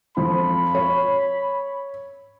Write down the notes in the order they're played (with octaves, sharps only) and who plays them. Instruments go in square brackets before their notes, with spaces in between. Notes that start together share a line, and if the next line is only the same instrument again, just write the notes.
[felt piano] F2 F3 [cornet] B5
[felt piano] C#5